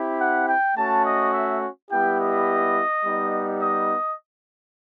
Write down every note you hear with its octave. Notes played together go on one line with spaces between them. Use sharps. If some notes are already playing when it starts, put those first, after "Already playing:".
Already playing: C4 E4 G4
F#5
G5
A3 C#4 F#4 A5
D#5
E5
G3 B3 E4 G4 G5
D#5
G3 B3 D#4
D#5